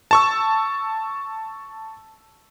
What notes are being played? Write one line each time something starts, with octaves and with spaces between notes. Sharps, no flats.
A5 C#6 E6